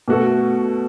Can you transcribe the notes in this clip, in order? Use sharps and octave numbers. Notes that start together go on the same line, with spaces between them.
B2 A3 F#4 A4